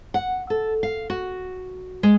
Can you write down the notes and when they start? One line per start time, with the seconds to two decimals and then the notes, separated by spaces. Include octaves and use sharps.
0.14 F#5
0.50 A4
0.83 F5
1.10 F#4
2.03 G#3